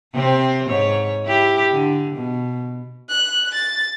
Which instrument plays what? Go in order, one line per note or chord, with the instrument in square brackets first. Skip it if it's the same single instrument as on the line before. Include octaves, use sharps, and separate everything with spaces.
[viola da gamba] C3 C4 C5
G#2 C#5
E4 G4
D3
B2
[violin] F#6
A6